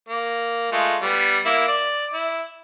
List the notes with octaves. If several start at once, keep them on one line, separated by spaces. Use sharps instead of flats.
A#3
G#3 A3 F4
G3 B3
A#3 E4
D5
E4